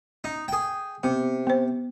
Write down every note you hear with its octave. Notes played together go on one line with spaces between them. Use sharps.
D#4
G#4 G5
C3 B3
B3 C5